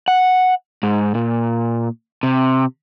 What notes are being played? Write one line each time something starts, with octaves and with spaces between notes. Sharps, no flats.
F#5
G#2
A#2
C3